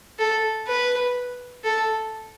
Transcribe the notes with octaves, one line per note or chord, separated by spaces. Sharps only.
A4
B4
A4